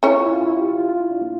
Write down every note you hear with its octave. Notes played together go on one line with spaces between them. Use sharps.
C#4 E4 C#5
F4
E4
F4
E4
G4
F4
F4
F4
E4
D4
A#3